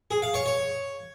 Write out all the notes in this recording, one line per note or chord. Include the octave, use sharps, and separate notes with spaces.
G#4
F5
C#5
C#5